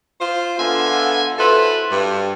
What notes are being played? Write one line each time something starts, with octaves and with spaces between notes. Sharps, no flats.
F4 C5
D3 B3 F4 E5 G#5
E4 F#4 A4 B4 C5
G2